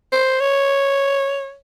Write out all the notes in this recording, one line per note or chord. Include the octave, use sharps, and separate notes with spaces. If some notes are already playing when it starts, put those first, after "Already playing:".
C5
C#5